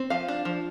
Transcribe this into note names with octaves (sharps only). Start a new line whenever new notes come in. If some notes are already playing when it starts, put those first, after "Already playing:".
Already playing: C4
F3 F5
D4
F3